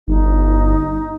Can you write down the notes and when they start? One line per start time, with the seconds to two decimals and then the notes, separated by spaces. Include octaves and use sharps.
0.08 G1 D#4